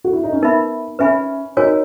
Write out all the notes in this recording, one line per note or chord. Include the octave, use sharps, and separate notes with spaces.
F#4
E4
D#4
C#4
B3 D#4 A#4 E5 B5
C#4 B4 E5 G#5 B5
D#4 F#4 A#4 C#5 G#5